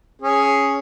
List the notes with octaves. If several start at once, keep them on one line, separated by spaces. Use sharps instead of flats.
C#4 G#4